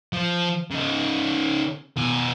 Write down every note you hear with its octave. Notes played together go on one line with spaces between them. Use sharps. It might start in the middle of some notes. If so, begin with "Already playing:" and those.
F3
C#3 D#4
B2 G#5